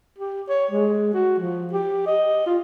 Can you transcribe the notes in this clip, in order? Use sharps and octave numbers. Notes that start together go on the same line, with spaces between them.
G4
C#5
G#3
F#4
F3
G4
D#5
F4